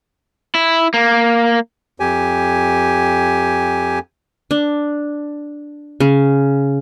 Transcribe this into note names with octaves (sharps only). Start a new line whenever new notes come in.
E4
A#3
F2 G4 G#5
D4
C#3